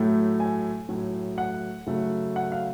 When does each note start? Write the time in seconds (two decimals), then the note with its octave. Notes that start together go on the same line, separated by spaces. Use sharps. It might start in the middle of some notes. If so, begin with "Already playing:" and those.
Already playing: A2 F#3 A3
0.40 G#5
0.89 A2 F#3 A3
1.38 F#5
1.87 C#3 F#3 A3
2.36 F#5
2.52 F5